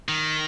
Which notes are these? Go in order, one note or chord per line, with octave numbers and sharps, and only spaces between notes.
D#3